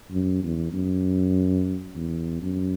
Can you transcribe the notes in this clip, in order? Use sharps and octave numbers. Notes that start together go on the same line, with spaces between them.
F#2
E2
F#2
E2
F#2